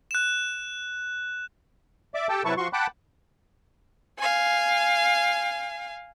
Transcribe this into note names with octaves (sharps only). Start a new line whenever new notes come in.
F#6 E7
D5 E5 D6
G4 A4 G5 A5
C3 F#3 E4 B4 A5 C#6
F3 F#4 C6 C#6
F#5 G5 A5 B5 D6 F#6
F5 G#5